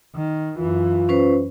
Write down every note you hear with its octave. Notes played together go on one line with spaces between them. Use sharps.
D#3
F#2 E3 F4
C#4 B4 C5